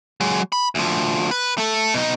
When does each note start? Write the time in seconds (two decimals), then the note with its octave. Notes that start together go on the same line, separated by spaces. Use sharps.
0.20 F#3 G#3
0.52 B5
0.75 D2 F3
1.31 B4
1.58 A3 A4
1.94 B2 D#4